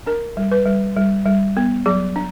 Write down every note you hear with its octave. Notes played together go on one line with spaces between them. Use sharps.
D4 A#4
G3
B4
G3
G3
G3
B3
F#3 G#4
D4